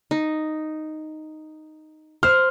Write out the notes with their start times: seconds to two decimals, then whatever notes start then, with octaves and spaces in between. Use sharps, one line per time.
0.11 D#4
2.23 C5 F6